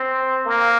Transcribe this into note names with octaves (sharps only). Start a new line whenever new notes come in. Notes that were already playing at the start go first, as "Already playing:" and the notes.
Already playing: C4
A#3